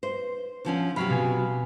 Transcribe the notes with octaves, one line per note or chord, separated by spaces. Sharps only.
C5
D3 F3 C#4
C3 F#3 F#4 B5 F6 C7
B2 F4 G#5